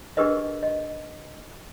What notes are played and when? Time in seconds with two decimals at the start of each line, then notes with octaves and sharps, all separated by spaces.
0.17 D4 G4 G#4 A#4 B4 D#5
0.63 D#5